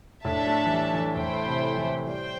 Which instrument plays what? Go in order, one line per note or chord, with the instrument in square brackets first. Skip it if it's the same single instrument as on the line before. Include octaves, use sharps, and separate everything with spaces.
[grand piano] A2 [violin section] D4 A4 E5 A5
[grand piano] A3
E3
G3
E3
[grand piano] A2 [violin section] A3 E4 C5 G5
[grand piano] C3
E3
[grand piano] G3 [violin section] C5 G5